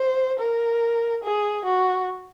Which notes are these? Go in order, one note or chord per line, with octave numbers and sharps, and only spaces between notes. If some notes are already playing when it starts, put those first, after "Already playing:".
Already playing: C5
A#4
G#4
F#4